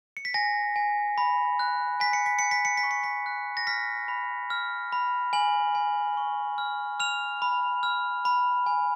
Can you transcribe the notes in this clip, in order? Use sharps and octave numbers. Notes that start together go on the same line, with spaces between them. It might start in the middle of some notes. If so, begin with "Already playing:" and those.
C#7
B6
G#5 A#6
G#5
B5
F#6
G#5 B6
C#7
B6
G#5 C#7
B6
C#7
B6
C#6
C#7
B6
F#6
A#6
F6 B6
B5
F6
B5
G#5 F#7
G#5
C#6
F6
F6 F7
B5
F6
B5
G#5